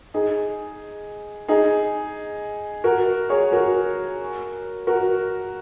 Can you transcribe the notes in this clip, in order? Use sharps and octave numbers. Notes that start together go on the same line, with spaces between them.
D#4 G#4
D#4 G#4
F#4 A#4
G#4 C#5
F#4 A#4
F#4 A#4